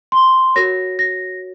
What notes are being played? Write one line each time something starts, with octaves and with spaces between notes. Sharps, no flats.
C6
F#4 A#4 C#5 A#6
A#6